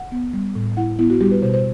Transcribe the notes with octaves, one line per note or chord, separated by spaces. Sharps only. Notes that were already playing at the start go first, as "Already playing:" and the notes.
Already playing: F#5
B3
G3
A2
E4 F#5
B3 E4
F#4
G3 G4
B4
B2 C5
C5